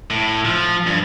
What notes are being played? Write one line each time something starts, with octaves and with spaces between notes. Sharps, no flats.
A2
F3
G2